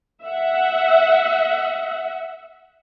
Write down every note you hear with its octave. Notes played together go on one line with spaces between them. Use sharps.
E5 F#5